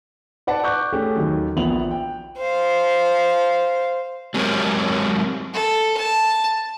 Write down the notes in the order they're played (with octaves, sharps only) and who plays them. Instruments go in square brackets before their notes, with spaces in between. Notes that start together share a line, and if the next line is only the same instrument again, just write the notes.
[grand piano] B4 D5 F#5 A5
C#6 D6 F#6 G6
A3 C#4 G4 G#4
D#2 D#3 F#3
A#1 A#2 B3 E5 F7 F#7
G5
[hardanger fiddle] C5 F5
[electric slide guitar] F#3 G#3 C4 G4 A#4 C#5
[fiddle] A4
A5